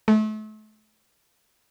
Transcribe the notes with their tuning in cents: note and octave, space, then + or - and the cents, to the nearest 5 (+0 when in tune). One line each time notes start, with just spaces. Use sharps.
A3 -35